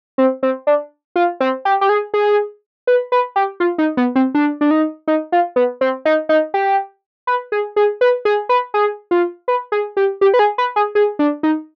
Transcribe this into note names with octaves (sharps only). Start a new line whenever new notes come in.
C4
C4
D4
F4
C4
G4
G4
G#4
G#4
B4
B4
G4
F4
D#4
B3
C4
D4
D4
D#4
D#4
F4
B3
C4
D#4
D#4
G4
B4
G#4
G#4
B4
G#4
B4
G#4
F4
B4
G#4
G4
G4
B4
G#4
B4
G#4
G#4
D4
D#4